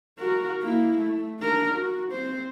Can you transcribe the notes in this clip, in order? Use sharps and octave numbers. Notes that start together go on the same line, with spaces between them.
F#4 A#4
A#3 E4
A3
D4 A#4
F#4
C4 C5